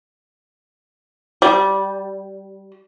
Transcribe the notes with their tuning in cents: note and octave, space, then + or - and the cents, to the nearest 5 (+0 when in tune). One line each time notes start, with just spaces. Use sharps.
G3 -10